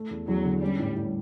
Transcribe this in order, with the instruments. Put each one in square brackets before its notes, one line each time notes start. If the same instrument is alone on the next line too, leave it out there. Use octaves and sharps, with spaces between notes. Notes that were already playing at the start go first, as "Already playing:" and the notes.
Already playing: [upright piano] A3
E2
[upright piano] E2 [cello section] F#3
[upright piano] D3
[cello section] G3 [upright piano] C#4
[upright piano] A2
A2